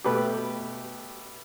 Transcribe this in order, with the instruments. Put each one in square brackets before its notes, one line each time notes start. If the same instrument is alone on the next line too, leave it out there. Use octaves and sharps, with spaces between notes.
[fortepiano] B2 A3 G4 B4